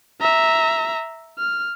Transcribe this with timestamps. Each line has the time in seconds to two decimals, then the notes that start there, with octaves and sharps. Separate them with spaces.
0.21 E5 A#5
1.38 F6